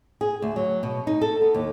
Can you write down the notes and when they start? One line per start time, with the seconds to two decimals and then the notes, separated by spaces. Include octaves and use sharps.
0.21 G#4
0.42 D2
0.56 F#3
0.83 B2
1.07 D#4
1.21 A4
1.41 B3
1.54 D#2